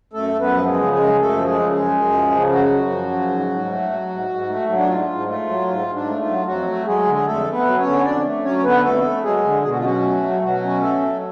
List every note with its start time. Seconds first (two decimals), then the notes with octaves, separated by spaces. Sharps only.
0.13 F#2 A3 A4
0.34 F#2
0.40 B3 B4
0.54 F3
0.67 G#3 G#4
0.74 C#3
0.93 F#2 G#3 G#4
1.13 F#2
1.19 A3 A4
1.33 F3
1.45 G#3 G#4
1.53 C#3
1.72 F#2 G#3 G#4
1.91 F#2
2.11 F3
2.31 C#3
2.51 F#2 F#3 F#4
2.71 F#2
2.90 F3
3.11 C#3
3.30 G#2
3.50 G#2
3.70 A3
3.89 F#3
4.09 G#2
4.29 G#2
4.49 A3
4.68 F#3
4.77 D4
4.88 G#2 F4
5.09 G#2
5.28 A3 F4
5.47 F#3
5.67 G#2 F4
5.88 G#2
5.94 D4
6.07 A3
6.20 F4
6.27 F#3
6.46 F2 F#3 F#4
6.67 A3
6.86 F#3 G#3 G#4
7.06 D3
7.14 G#4
7.25 F2 A3 A4
7.46 A3
7.52 B3 B4
7.65 F#3
7.79 C#4 C#5
7.86 D3
8.05 F2 D4 D5
8.25 A3
8.44 F#3 C#4 C#5
8.58 C#5
8.64 D3 B3 B4
8.83 F2 A3 A4
9.04 A3
9.23 F#3 G#3 G#4
9.44 D3
9.63 B2 G#4
9.70 F#4
9.78 F4
9.83 F#3 C#4 F#4
10.02 A3
10.23 F#3
10.42 B2 F#3 F#4
10.62 C#4
10.81 A3 A4
11.02 F#3